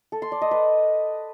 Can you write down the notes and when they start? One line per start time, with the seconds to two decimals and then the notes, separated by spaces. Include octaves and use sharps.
0.12 A4
0.22 C6
0.32 D5
0.42 D#5
0.51 B4